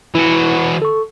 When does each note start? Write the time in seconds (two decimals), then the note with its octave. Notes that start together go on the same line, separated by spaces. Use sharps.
0.15 E3 E4 F#4
0.82 A4 C#6